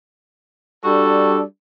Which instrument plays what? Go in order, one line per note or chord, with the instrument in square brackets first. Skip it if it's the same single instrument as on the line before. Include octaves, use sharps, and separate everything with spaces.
[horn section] G3 D4 F#4 A4 D5